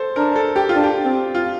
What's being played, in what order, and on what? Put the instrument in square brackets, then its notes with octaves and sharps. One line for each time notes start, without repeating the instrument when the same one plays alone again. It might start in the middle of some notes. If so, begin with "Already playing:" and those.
Already playing: [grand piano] A4 C5
[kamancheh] D4 [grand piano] A#4
[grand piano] A4
G4
F4
[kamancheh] D4
[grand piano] G4
[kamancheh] C4
[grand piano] F4